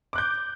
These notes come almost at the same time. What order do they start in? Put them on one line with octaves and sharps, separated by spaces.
D6 F#6 G6